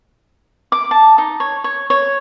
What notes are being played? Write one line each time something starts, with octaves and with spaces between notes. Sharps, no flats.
D6
A5
D#4
C#5
C#5
C#5